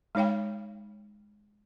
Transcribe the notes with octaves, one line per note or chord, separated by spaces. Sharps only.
G#3 D#4 C#5 F5 G5